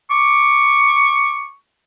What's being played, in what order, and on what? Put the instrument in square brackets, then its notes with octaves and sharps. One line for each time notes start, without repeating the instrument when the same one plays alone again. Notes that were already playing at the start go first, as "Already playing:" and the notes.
[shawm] C#6 [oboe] D6